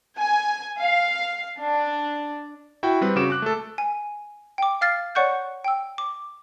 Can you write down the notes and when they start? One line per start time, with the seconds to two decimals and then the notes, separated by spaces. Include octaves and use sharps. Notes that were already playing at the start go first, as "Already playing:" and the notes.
0.18 G#5
0.80 F5
1.59 D4
2.83 E4 F#4 G5
3.01 G3 C4 B4
3.16 C#3 F#4 D6 D7 E7
3.30 D6 F#6
3.42 A3 A4
3.78 G#5
4.58 G5 D6
4.81 F5 F6 A6 C7
5.15 C#5 D5 F#5 C#6 F#6 G6
5.64 G5 E6
5.98 D6